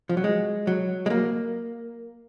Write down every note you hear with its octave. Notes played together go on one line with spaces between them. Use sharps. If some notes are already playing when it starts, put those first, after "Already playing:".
F3
F#3
G#3
F#3
G#3
A#3